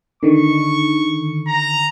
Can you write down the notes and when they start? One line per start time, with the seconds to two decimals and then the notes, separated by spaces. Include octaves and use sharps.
0.23 D3 D#3 C#6
1.47 A#5